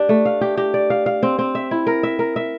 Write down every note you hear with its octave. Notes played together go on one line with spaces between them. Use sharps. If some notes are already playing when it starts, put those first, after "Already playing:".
Already playing: D4 G4
A3
F5
G4
G4
D5
F5
F5
C4
C4
E5
E4
A#4
E5
A#4
E5